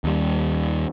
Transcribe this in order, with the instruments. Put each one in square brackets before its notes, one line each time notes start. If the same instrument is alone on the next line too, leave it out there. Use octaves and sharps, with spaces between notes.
[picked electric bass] D#2 G3